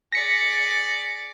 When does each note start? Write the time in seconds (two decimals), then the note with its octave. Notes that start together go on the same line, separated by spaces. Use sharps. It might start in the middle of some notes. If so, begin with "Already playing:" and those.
0.12 G#4 D5 A#6 B6 C#7